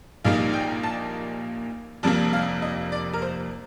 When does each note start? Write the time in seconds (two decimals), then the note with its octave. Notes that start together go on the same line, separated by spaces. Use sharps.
0.24 A#1 A#2 G3 A#3 D#4 F5
0.53 G5
0.83 A5
2.03 F1 F2 C3 G3 A#3 A5
2.33 F5
2.62 D#5
2.92 D5
3.13 A#4
3.22 C5